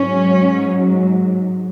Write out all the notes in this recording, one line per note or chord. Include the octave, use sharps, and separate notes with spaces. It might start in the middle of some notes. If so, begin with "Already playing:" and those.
Already playing: G#2 F#3 C#4